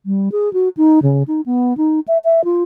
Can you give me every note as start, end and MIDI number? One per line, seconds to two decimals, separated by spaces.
0.06 0.29 55
0.32 0.52 68
0.53 0.69 66
0.77 0.99 63
1.03 1.23 49
1.28 1.41 63
1.46 1.76 59
1.77 2.00 63
2.08 2.18 76
2.24 2.44 76
2.44 2.63 65